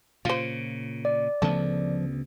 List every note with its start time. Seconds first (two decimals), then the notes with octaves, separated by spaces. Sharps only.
0.25 A#2 C#3 F4 C5
1.05 D5
1.42 D2 C#3 F3 A3 B3 A4